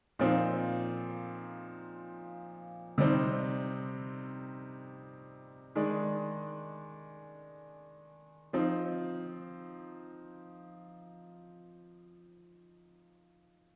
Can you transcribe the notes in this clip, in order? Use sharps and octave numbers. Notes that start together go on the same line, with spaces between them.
A#2 F3 C4 D#4
C3 G3 C4 D#4
D#3 G#3 D4
F3 C4 D#4